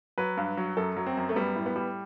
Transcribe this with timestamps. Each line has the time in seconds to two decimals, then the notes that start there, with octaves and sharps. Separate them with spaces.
0.18 F#3 B4
0.37 G2
0.57 F#3
0.77 F#2 A4
0.97 F#3
1.06 C4
1.17 F#2
1.29 A3
1.36 G3 B3
1.56 A2
1.66 B3
1.76 G3